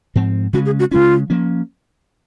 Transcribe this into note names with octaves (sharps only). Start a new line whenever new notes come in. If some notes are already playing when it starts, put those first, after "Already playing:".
G#2 F3 C4
C#3 G#3 C#4 F#4
G#4
F#4
C#3 G#3 C#4 F4
F3 A#3 C#4